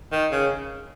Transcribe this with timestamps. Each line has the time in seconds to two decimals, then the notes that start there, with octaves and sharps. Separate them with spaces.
0.12 D#3
0.32 C#3